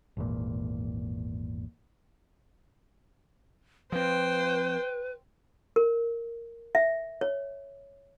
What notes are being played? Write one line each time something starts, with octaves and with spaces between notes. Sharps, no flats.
G#1 E2 A#2
F3 C4 B4 C5 G5
A#4
E5
C#5